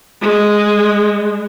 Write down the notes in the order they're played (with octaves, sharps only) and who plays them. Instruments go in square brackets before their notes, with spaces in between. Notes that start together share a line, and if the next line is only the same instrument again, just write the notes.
[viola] G#3